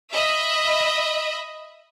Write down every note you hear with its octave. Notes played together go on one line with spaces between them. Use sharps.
D#5 E5 B5